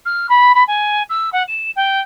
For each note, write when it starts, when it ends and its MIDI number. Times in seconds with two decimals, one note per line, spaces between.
0.05 0.27 89
0.29 0.52 83
0.55 0.63 83
0.67 1.03 80
1.09 1.30 88
1.32 1.43 78
1.48 1.71 100
1.76 2.00 79